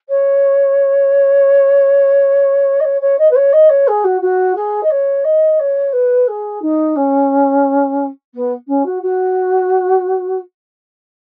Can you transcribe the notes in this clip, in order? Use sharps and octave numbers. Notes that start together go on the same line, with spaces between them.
C#5
D#5
C#5
C#5
D#5
B4
C#5
D#5
C#5
G#4
F#4
F#4
G#4
D#5
C#5
D#5
C#5
B4
G#4
D#4
C#4
B3
C#4
F#4
F#4